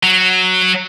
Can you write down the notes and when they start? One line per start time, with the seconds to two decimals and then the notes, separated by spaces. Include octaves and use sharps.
0.03 F#3